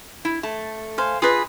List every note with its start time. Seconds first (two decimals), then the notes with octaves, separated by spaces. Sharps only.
0.25 E4
0.43 A3 A5
0.98 C5 F5 G#5
1.22 F4 G#4 B4 D#5